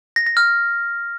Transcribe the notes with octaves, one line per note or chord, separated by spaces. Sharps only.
A#6
A#6
F6